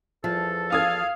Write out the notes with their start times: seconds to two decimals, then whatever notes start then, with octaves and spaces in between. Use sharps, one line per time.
0.24 E2 F3 A4
0.72 F5 D#6 G#6